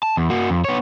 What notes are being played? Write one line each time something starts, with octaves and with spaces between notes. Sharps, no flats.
A5
E2
A#3 F#4
F2
B3 C#5